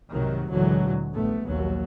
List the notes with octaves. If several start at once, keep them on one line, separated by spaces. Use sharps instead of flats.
C2 G#2 C3 D#3 F#3
D2 A#2 D3 E3 F#3 G#3
A#1 G2 A3 B3
A#1 D#2 F#3